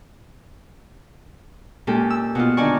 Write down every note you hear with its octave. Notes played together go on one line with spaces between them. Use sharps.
A#2 G#3 C#4 G4 A4
E6
B2 F4
D3 D#3 D4 D5 G#5 C#6